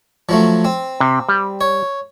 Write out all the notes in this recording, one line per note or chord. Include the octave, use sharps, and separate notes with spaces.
F3 F#3 A3
C4
C3
G3
C#5